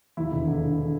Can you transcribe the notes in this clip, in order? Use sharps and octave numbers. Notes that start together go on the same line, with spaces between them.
D#2 E4
E1
D3
E1